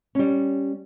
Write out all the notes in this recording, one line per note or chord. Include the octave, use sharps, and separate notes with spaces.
G3 C#4